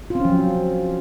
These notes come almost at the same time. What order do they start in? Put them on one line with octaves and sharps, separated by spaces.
F4 C4 C#4 F3 F#3